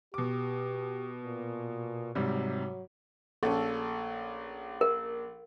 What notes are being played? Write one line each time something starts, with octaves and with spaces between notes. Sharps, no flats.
B2 G4 D6
A#2
G#2 C3 F#3 G3
A#1 C#4 A4
A#4